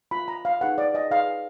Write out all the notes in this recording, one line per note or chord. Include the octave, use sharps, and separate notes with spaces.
F4 A#4 B5
A#5
F5
D#4 G#4 B4 F#5
D5
D#5
D#4 G#4 B4 F5